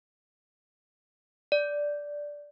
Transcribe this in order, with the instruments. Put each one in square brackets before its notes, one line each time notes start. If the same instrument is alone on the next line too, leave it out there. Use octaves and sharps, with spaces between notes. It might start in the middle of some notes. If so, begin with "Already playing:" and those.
[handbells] D5